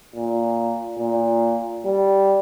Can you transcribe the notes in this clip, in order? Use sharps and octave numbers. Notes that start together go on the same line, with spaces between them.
A#2
A#2
G3